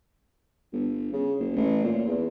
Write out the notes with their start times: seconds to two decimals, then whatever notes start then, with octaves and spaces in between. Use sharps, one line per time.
0.73 G1
1.13 C#3
1.39 F#1
1.56 A1
1.84 A#2
2.06 E2